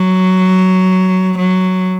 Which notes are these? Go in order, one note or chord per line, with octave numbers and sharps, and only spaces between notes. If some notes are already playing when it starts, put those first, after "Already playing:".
Already playing: F#3
F#3